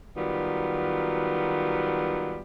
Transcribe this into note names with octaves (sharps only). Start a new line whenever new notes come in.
D#3 F#3 G3 B3 F4